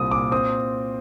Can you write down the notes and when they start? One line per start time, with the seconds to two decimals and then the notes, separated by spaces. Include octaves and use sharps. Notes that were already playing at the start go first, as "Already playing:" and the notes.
Already playing: C2 A#2 C4 D#6
0.11 A#2 D6
0.32 C4 D#6